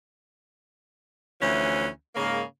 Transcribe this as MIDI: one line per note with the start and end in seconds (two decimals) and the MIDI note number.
1.41 1.87 38
1.41 1.87 52
1.41 1.87 53
1.41 1.87 61
2.15 2.41 44
2.15 2.41 49
2.15 2.41 58